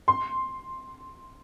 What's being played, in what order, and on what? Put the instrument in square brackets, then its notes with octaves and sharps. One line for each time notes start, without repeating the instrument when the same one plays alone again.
[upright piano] C6